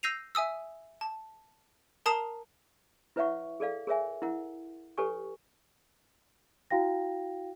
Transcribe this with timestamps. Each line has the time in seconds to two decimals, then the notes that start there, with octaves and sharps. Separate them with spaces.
0.03 E6 G6 A#6 C7 D#7 F7
0.35 E5 G#5 D#6 E6
1.01 A5
2.06 A#4 A5 A#5 D#6 C7 E7
3.16 E4 B4 C#5 E5 F#5 C#6
3.60 G#4 A4 D5 F5
3.87 G#4 A#4 C#5 E5 G#5
4.22 E4 A#4 F#5
4.98 G4 A4 B4 C#5 G#5 C#6
6.71 E4 F#4 F5 G5 A#6